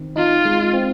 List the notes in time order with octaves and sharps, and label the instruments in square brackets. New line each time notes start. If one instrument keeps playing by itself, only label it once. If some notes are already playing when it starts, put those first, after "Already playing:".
Already playing: [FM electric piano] D#3 C4
[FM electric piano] D#4 [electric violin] F4
[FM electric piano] G#3
C4